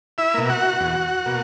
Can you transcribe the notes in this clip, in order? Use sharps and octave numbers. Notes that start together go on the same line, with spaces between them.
E4 E5
B2 A#3
F#4 F#5
E2
B2 A#3